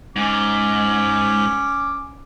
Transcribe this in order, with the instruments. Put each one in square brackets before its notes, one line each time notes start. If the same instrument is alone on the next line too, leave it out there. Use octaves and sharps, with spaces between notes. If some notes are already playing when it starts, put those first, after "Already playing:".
[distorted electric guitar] G#2 [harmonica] C#4 D6